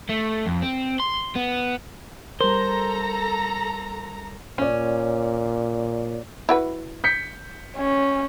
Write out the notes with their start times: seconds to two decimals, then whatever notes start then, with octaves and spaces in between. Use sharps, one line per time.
0.10 A3
0.47 F2
0.63 C4
1.00 C6
1.36 B3
2.41 G3 A4 A#4 C5 A#5
4.58 A#2 C#4 C#5 D5
6.49 E4 F#4 B4
7.04 G6 B6 C#7
7.77 C#4